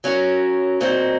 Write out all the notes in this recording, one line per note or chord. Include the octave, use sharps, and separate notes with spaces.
F#3 C#4 F#4 A#4
A#2 F#3 C4 D#4